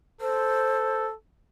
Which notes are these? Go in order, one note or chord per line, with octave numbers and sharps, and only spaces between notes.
A4 C5